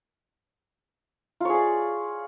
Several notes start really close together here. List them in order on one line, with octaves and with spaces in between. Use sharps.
F4 C#5 G#4 D5